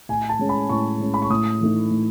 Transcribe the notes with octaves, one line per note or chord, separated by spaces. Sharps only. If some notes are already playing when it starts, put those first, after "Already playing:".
A2 G#5
A5
G#3 C#4
B5
A2 C#6
G#3 C#4
B5
C#6
A2 D#6
E3 A3 D#4
A2